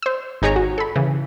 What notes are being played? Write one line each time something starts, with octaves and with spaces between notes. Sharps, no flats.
C5 E6
G#1 D#4 G#4 C#5 A#5
F#4
A4 B5
C#3 E3